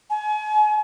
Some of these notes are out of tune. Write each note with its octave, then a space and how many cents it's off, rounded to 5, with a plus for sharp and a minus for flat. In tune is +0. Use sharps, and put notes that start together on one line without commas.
G#5 +35